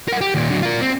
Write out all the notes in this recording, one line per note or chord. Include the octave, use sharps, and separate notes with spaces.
A#4 F#5
G4
D#2 A#2
D3 F#3
F4 A#4
C4